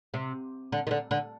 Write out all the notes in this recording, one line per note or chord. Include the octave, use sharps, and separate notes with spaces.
C3
D3
D#3
D3
D3